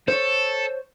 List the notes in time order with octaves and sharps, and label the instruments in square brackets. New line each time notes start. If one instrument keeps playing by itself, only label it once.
[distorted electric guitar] A4 [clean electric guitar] C5 C#5